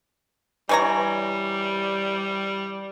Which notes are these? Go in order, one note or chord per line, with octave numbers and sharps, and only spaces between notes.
E3 G3 C#5 A#5